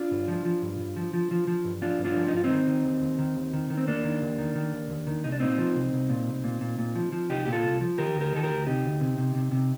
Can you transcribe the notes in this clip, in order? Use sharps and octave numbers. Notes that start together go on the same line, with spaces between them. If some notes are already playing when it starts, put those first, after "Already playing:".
Already playing: D4 F4
G2
F3
F3
G2
G2
F3
F3
F3
F3
G2
F3 D4 F4
G2
D4 F4
F3
D#4
G2 F4
C4 D#4
D#3
D#3
D#2
D#2
D#3
D#2
D#3
D#3
C4
D#2 A#3 D4
D#3
D#2
D#3
D#3
D#2
D#2
D#3
C2 D#4
D4
A#2 C4 D#4
F3
C2
C2
A#2
C2
A#2
A#2
A#2
F3
F3
C2 D#4 G4
A#2 G4
F4 A4
C2
F3
D#3 G4 A#4
D2
G4 A#4
D#3 A4
G4 A#4
D2
C3 D#4 G4
D2
C3
C3
C3
C3